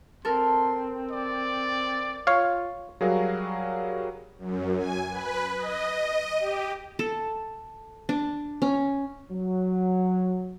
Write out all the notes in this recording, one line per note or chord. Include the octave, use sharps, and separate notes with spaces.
C4 A4 A#4 C6
D5
F4 C#5 F5
F#3 G3 F#4 G#4 A#4 F5
F#2
G#5
B4
D#5
G4
A4
D4
C#4
F#3